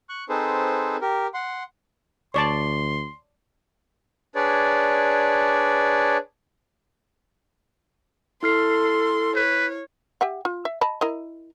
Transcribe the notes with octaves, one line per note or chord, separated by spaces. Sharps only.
C#6 F#6
C4 D#4 G#4 A4 B4 C5
G4 A#4
F#5 C6
D2 C#5 D5 A5 C6
D4 G#4 B4 C#5 D5
E4 A4 C6 F6 C7
B4 C#5
G4 E5 F#5
F4
E5
D#5 A5 B5
E4 A#4 D#5